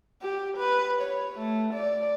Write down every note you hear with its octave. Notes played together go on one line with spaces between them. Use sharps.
G4
B4
C#5
A3
D5